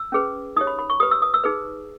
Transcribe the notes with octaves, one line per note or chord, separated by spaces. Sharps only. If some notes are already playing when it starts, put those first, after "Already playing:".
Already playing: E6
C#4 G#4 B4
D#4 G4 C#5 D#6
B5
B5
C#6
G4 B4 D#6
E6
D#6
E6
D#4 G#4 B4